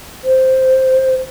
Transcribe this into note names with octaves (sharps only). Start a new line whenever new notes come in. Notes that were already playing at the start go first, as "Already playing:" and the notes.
C5